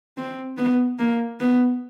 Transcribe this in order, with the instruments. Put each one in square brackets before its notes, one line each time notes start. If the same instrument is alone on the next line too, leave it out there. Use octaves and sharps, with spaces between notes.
[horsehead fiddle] C4
B3
A#3
B3